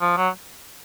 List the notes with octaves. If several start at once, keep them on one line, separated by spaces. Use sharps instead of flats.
F3
F#3